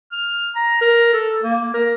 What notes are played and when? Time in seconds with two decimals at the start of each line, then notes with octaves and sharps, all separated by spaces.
0.12 F6
0.55 A#5
0.81 A#4
1.13 A4
1.43 A#3
1.74 A#4